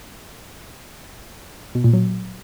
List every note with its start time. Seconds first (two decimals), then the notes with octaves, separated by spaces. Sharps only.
1.75 B2
1.84 A#2
1.93 F#3